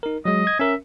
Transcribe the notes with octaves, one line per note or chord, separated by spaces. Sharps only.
D#4 A#4
F#3 G#3 D#5
G#6
C#4 A#4 E5